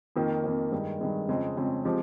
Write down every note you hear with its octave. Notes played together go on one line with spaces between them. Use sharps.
F2 D#3 A#3
F2 D#3 A#3
G2 D#3 G#3
G2 D#3 G#3
F2 C#3 G#3 C4
F2 C#3 G#3 C4
F3 G#3 C4 G4